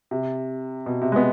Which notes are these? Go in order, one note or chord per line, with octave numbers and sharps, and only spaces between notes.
C3
B2
C3
G#3
B3